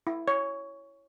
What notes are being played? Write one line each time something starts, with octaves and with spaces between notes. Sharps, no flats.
E4
C#5